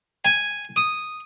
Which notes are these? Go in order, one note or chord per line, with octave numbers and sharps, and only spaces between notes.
G#5
D#6